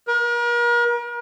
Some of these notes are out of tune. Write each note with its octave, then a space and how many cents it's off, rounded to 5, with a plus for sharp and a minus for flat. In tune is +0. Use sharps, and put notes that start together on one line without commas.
A#4 +40